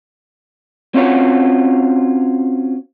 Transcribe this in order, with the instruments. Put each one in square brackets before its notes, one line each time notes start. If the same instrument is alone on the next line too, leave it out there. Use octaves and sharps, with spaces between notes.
[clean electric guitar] C4 C#4 F4 F#4 C#5